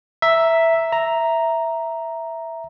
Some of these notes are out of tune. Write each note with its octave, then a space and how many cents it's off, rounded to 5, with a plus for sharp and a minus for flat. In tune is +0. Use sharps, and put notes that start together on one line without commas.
E5 +0 A#5 +0
E5 +0 A#5 +0